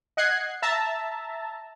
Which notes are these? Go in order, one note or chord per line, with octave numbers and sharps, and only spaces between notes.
D#5 F#5 F#6 G#6 C7
E5 A5 A#5